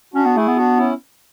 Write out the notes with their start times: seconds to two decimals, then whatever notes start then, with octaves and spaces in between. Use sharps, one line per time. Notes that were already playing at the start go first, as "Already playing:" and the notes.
0.14 C#4 D4 F#4
0.25 B3
0.35 A3 E4 G#4
0.48 B3
0.56 D4 F#4
0.77 C#4 E4